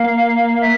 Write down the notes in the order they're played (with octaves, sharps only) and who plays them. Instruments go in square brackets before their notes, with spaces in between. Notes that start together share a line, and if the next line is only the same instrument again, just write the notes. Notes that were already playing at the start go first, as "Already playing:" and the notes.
Already playing: [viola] A#3 [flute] F5
[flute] E5